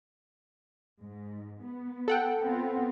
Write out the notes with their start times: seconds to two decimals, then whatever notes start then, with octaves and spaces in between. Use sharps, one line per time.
1.02 G#2
1.63 B3
2.08 A4 F#5 G5
2.41 B3 C4 F4